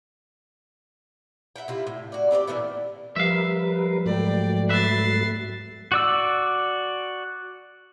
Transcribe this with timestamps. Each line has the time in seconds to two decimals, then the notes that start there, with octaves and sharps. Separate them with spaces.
1.56 E4 E5 F#5 G5
1.68 C3 E4 F4
1.87 A2
2.12 F#4 D5
2.31 C4 G4 B4 D5
2.47 A#2 E3 A3 B3
3.16 F3 G3 A#4 B4 E5 F5
4.06 G#2 F#3 A3 D5 G5
4.69 B4 E5 A6 C7
5.92 F#4 D5 E6